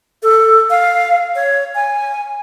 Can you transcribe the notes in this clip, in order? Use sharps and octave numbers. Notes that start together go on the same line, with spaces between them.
A4
F5
C#5
G#5